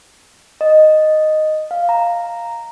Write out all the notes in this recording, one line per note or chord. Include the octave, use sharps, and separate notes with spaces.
D#5
F5
A#5